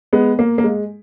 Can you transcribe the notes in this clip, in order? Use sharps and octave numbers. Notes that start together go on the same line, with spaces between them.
G#3 B3
A#3
A#3
G#3